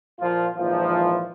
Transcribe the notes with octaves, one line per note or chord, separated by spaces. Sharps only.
A#2 F3 F4
G#1 A#2 E3 F3